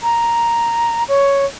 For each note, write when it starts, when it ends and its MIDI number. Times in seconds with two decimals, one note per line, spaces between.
0.01 1.03 82
1.08 1.45 73